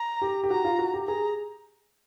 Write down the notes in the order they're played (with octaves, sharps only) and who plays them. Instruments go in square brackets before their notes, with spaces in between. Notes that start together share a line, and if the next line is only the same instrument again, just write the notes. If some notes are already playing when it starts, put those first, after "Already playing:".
Already playing: [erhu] A#5
[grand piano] G4
G4
[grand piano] F#4 [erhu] A#5
[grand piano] F4
F#4
G4
[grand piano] G#4 [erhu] A#5